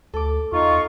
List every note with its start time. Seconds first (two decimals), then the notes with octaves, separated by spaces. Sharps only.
0.14 D2 A4 D6
0.52 E2 D#4 F4 C#6